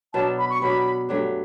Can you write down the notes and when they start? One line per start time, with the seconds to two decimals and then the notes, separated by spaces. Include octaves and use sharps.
0.13 B2 F#3 B3 D4 A5
0.38 B5
0.50 C#6
0.61 B2 F#3 B3 D4 B5
1.09 G2 F#3 A3 D4